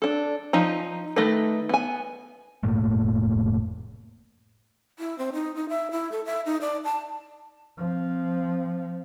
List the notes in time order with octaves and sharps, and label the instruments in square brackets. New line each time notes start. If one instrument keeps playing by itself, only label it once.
[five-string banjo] D4 A4
F3 D#4 A#5
D#3 A3 D#4 B4
B3 G#5
[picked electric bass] F1 A2 A3 A#3
[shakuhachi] E4
C4
D#4
D#4
E5
E4
A4
E5
D#4
D5
A5
[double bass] F3 C4